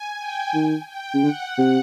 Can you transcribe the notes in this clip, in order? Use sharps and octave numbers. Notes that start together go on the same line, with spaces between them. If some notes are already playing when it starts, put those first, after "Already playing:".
Already playing: G#5
G5
D#3
G5
C#3
D3 F#5
C3